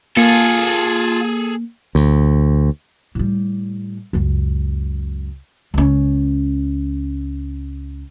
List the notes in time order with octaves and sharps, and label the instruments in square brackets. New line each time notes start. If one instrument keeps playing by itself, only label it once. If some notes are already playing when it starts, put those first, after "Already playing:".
[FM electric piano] A#3 [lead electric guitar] F4 [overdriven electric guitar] G#4 A4
[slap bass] D2
[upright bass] A2 G3
C#2 F#2
C#2 C#4